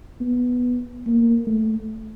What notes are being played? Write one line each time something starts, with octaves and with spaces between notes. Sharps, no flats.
B3
A#3
A3